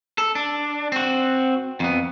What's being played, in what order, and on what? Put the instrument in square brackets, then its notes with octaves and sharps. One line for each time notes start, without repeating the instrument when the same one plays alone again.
[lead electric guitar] A4
D4
C4 F#4
F2 B3